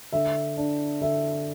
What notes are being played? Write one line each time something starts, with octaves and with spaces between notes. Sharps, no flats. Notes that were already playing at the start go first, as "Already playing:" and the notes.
D3 E5
D4
D3 E5